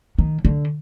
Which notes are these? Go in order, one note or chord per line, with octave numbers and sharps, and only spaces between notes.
D#3
D3